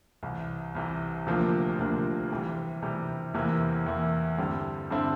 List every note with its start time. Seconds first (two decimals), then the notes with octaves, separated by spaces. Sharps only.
0.23 C2 C3 E3
0.75 C2 C3 E3
1.27 D2 C3 F3 A#3 D4
1.79 D2 C3 F3 A#3 D4
2.31 C3 E3 G3
2.82 C3 E3 G3
3.34 E2 C3 E3 A#3 E4
3.86 E2 C3 E3 A#3 E4
4.38 G2 D3 G3 C4 E4
4.90 G2 D3 G3 C4 E4